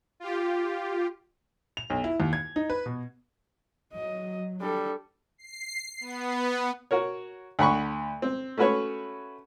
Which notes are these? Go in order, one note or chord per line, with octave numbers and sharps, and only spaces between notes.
F4 G4
F7
B1
E4
D#2
G#6
D#4
B4
B2
F#3 D#5
G3 D4 A4
C7
B3
F#4 A#4 C#5
D2 F#5 B5 C#6
C4
A3 C#4 F#4 B4 C#5